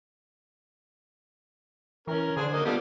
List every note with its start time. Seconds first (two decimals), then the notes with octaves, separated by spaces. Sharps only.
2.07 E3 C#4 A#4
2.37 D3 D4 G#4 C5
2.52 F#3 A#3 D#5
2.65 F3 G3 A3 B3